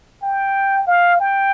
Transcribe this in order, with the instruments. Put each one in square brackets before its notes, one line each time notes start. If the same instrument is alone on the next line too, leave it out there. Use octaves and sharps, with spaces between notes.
[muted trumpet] G5
F5
G5